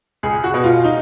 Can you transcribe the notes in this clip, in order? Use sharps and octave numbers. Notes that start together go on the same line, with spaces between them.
C#2 G#4
F#4
B2
F4
D#4